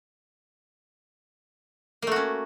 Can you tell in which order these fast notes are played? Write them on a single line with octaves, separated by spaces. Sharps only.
A#3 A3 F#4 C#4